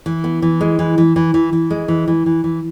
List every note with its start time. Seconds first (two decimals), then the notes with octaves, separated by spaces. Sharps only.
0.06 E3
0.24 B3
0.42 E3
0.61 G#3
0.79 E3
0.98 E3
1.16 E3
1.34 E3
1.53 E3
1.70 G#3
1.88 E3
2.08 E3
2.26 E3
2.44 E3